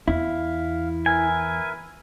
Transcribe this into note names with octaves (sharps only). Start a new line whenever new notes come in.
E2 E4 F5
A#4 B4 E5 G#5